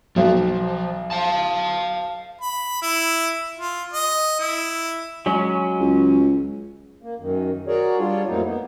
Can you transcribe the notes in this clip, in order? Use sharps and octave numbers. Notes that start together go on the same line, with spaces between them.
B1 F3 F#3
F5 A5
B5
E4
F4
D#5
E4
F#3 G#3 C#4
C#2
A#3
F#2 D#3
F#4 G#4 A#4 C#5 D5
G3 D4 F4 C#5
F2 A2 C3 F#3 A#3 D#4
A#3 B3